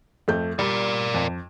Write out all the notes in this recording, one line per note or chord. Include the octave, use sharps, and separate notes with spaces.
F2 A3 G6
G3 A#4 D5
F2